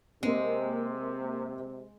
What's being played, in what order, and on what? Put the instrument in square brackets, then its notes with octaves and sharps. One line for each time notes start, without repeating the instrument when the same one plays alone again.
[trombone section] C3 [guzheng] G#3 [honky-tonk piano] A#3 C4